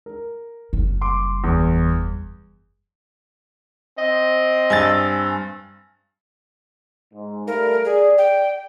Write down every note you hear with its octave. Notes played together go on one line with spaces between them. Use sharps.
A#4
F#1 G3
C6 D6
E2
C4 D#5
G2 G#5 E6 A6
G#2
G3 A3 A#4 F5
G#4 D5
G5